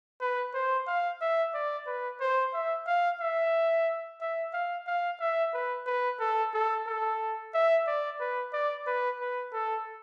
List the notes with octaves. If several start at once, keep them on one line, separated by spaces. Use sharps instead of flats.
B4
C5
F5
E5
D5
B4
C5
E5
F5
E5
E5
F5
F5
E5
B4
B4
A4
A4
A4
E5
D5
B4
D5
B4
B4
A4